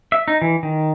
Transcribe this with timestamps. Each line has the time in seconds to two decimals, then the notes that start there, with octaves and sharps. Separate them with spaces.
0.12 E5
0.28 D#4
0.42 E3
0.63 D#3